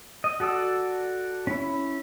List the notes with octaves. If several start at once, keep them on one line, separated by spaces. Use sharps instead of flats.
D#5
F#4 A4 D5 E6
C#4 E4